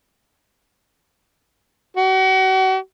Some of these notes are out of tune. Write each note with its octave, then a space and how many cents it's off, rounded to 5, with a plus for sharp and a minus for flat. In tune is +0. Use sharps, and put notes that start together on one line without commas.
F#4 +40